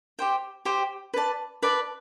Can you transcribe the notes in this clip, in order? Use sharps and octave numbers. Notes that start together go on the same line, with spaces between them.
G4 C5 G5
G4 C5 G5
B4 D5 A5
B4 D5 A5